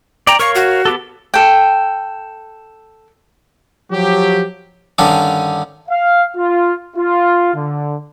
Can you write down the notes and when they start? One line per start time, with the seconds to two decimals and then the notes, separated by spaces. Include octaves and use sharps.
0.27 D5 G5 A#5
0.39 A#4 C#5 F5 C#6
0.55 F#4
0.85 B3 G4 A4
1.34 A4 G5
3.91 F3 F#3 G4
4.98 G2 D3 D#3 C#4 D4
5.88 F5
6.36 F4
6.97 F4
7.55 D3